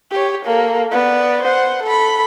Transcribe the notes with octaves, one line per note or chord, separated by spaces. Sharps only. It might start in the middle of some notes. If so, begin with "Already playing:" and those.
G4 C#5
A#3 A4
B3 D5
C5 F#5
A4 B5